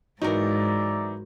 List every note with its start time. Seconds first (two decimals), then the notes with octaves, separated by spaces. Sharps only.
0.22 G#2 E3 F#3 D#4 A#4 D5 E5 A#5